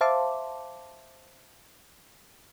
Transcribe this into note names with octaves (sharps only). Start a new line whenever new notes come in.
C5 E5 F5 A5 C6 D6